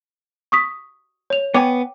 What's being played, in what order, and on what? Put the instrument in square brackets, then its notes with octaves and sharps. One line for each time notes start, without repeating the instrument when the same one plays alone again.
[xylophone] C#6 D#6 B6
C#5 F7
[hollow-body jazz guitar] B3 C#5 G#5 [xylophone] G5 D6